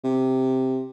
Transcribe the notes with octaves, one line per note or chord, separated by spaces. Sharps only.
C3